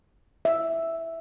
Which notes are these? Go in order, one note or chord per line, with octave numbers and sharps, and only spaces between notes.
E5